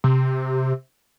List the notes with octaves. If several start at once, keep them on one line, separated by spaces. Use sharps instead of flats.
C3